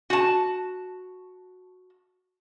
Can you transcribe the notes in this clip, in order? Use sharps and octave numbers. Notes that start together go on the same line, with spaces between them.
F#4 A5